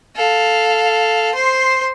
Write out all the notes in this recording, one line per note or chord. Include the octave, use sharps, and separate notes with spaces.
A4 F5
C5 C6